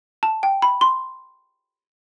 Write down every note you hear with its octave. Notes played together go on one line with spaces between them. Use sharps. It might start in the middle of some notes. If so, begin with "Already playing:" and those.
A5
G5
B5
C6